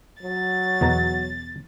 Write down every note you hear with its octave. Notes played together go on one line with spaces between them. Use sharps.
F#3 A6
E2 B2 A#5